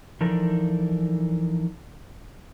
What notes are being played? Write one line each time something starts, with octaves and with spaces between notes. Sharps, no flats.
E3 F3 D4 D#4 A4 A#4